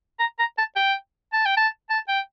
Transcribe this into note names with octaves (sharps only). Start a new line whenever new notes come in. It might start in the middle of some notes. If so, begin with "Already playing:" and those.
A#5
A#5
A5
G5
A5
G5
A5
A5
G5